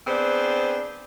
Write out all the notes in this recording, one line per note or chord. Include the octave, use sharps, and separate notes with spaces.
B3 C4 D4 G#4 C5